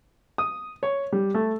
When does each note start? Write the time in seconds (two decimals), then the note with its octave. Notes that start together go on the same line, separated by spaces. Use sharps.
0.38 D#6
0.83 C#5
1.12 G3
1.35 A3